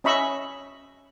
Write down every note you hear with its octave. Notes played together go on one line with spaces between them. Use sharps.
C#4 D#5 E5 B5 C#6 E6